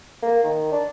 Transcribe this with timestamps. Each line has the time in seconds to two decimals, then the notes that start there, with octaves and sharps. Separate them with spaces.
0.23 A#3
0.44 D#3
0.72 D4